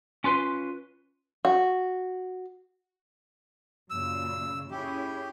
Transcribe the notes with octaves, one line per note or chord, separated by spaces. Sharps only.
C#4 F4 B4 C6
F#4
F#2 A#2 C#3 E6
C#4 E4 G4 G#4